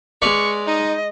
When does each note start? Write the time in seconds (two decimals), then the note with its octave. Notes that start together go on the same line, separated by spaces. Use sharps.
0.22 G#3 B4 D5 F5 C#6
0.67 D#4 D#5